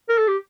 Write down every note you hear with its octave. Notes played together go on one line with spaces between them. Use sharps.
A#4
A4
G4